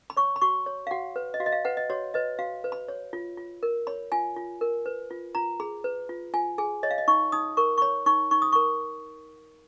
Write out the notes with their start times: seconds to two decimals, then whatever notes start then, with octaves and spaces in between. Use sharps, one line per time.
0.10 B5
0.17 C#5 C#6
0.36 B5
0.42 F#4 C#6
0.66 C#5
0.87 F5
0.91 F#4 F#5
1.16 B4
1.34 D#5
1.40 F#4 F5
1.46 D#5
1.52 F5
1.65 B4 F#5
1.77 D#5
1.90 F#4 C#5
2.14 B4 D#5
2.39 F#4 F5
2.64 B4
2.72 B5
2.88 C#5
3.13 F4
3.38 F4
3.63 A#4
3.87 C#5 B5
4.12 F4 G#5
4.36 F4
4.61 A#4
4.86 B4
5.11 F4
5.35 F4 A#5
5.60 G#4 B5
5.84 B4
6.09 F4
6.34 F4 G#5
6.58 G#4 G#5
6.83 C#5 D#5
6.91 F5
6.98 D#5
7.08 D#4 C#6
7.32 D#4 D#6
7.57 A#4 C#6
7.78 C#6
7.82 C#5 B5
8.06 D#4 C#6
8.31 D#4 C#6
8.42 D#6
8.52 A#4 C#6